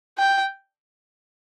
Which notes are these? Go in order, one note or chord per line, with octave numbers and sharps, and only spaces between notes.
G5